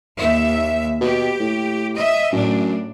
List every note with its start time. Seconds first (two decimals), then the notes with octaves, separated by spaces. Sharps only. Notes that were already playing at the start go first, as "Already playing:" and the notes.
0.16 D#2 E5
1.01 B2 G4
1.40 A2
1.95 D#5 E5
2.32 F#2 A2 D4